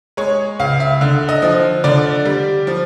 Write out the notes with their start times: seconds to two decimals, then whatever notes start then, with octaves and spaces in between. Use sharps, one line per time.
0.17 G#3 C#5
0.59 C#2 F5
0.80 E5
1.01 D3
1.29 D#5
1.42 F3
1.84 D3 D5
2.25 G3
2.67 F3